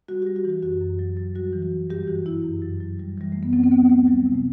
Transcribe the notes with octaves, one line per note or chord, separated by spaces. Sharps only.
G3 F#4
G3 G4
F#4
E3 G4
F#2 F#4
F#2
F#3
F#3
G3 F#4
E3
F#4
G2
G3 G4
E3 F#4
G2 E4
F#2
F#3
F#3
G3
E3 G3
F#2 A3
B3
F#3 C4
C4
D3 B3
D2 A3
F#3 G3
C3
A3